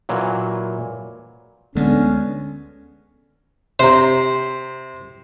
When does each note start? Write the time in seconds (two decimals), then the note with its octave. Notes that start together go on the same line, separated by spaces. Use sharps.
0.09 A#2 E3 F#3
1.75 D2 D3 G#3 B3 C#4
3.79 C3 C5 A#5